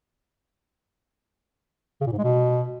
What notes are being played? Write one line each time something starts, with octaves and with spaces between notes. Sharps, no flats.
C#3
A#2
G#2
G#3
B2